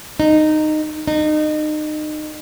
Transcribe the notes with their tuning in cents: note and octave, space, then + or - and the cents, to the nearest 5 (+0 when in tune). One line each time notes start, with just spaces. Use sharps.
D#4 -15
D#4 -30